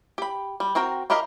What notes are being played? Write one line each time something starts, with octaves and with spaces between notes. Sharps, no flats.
G4 B5
G3
C4 F#4 A#4 G5
E4 G4 A#4 D#5 F5